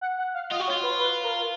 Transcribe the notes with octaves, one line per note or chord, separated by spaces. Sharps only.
F#5
F#5
F5
F4 D#5
F#4
C#5
F4
B4
B4
A#4